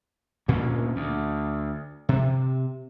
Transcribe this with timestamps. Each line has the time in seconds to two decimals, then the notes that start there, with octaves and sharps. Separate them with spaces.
0.48 D2 A#2 A#3 C#4
0.96 D2
2.09 C3